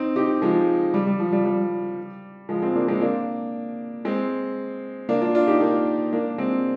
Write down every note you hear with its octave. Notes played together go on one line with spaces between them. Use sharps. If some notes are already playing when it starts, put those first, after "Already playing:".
Already playing: C4 D#4
D#4 G4
F3 G#3
G3
G3
F3
G3
G3
F3 G#3
G#3 C4
A#3 D4
G#3 C4
A#3 D4
G#3 C4
A#3 D4
D4 F4
D4 F4
D#4 G4
A#3 D4
A#3 D4
G#3 C4